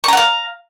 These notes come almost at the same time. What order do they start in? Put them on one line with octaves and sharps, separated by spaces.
C#6 A#5 F#5 F5